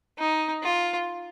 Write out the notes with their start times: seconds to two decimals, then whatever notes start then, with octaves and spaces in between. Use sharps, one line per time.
0.18 D#4
0.63 F4